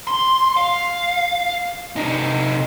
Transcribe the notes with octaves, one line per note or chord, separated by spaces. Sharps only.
C6
F5
C3 D#4